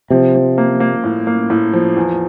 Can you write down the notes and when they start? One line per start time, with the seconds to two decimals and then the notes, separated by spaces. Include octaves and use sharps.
0.11 C3 F3
0.35 F3
0.58 A#3
0.80 A#3
1.04 A2
1.27 A#3
1.50 A2
1.73 F3
1.96 E2